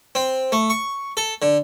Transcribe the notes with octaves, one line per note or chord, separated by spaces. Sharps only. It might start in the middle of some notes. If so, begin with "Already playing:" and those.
C4
A3
C#6
A4
D3